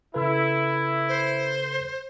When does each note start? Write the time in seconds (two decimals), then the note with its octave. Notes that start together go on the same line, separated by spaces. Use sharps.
0.14 C#3 E4 A4 B4
1.08 C5